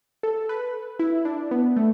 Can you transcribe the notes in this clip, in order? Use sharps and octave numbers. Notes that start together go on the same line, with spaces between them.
A4
B4
E4
D4
B3
A3